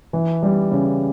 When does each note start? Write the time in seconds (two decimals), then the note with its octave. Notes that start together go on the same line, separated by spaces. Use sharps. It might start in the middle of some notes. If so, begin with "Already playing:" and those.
0.13 E3
0.43 G3
0.71 C#3